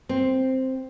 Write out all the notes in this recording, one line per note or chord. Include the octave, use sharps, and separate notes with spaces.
C4